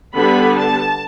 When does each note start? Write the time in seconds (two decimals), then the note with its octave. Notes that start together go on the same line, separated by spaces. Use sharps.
0.14 D3 G3 B3 B5
0.58 A5